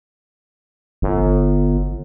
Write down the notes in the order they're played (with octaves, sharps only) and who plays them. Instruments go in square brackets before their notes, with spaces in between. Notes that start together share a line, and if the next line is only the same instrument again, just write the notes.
[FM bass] G1